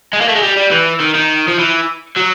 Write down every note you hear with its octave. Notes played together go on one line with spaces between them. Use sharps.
G#3
A#3
A3
G#3
G3
G3
E3
D#3
D#3
F3
E3
F#3